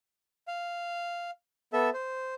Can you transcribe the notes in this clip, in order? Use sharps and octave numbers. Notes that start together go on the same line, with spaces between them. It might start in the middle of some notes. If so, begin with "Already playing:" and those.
F5
B3 A4 E5
C5